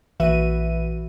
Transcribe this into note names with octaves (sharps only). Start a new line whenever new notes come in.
A#1 E3 F#4 B4 E5 D#7